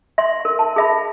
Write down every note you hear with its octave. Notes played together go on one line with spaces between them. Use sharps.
E5 C6
A#4
A5
G#4 E5 B5